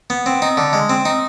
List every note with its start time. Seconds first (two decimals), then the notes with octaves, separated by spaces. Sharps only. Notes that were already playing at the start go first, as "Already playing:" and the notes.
0.10 B3
0.26 C4
0.42 D#4
0.57 D3
0.73 G#3
0.89 C4
1.05 D#4